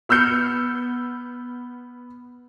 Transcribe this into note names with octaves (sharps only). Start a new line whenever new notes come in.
B3 E6 F6 G6 C#7